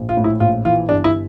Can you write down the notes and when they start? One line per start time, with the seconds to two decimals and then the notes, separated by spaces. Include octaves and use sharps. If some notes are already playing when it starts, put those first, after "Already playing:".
Already playing: A#1
0.09 F4
0.17 A2
0.24 E4
0.40 A#1 F4
0.65 E3 F4
0.89 G1 D4
1.04 E4